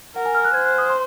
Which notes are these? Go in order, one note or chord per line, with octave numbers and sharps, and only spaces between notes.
A#4 F#5
G#5
F6
F#6
C5 G#6
F#6
D#6
C6